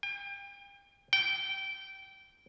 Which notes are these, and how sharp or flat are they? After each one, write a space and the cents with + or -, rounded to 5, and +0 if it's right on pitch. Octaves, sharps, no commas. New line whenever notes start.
G5 +35
G5 -20